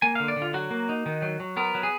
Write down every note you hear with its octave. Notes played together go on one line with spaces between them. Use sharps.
A#3 G#5
D3 F5
D5
D3
F4
F#3 F#4
A#3
D#4
D#3
F#3
F#3
B3 A#4
F#3
G#4